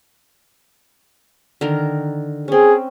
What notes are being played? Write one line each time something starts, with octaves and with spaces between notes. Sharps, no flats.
D3 D#3 A#4
C4 C#4 G#4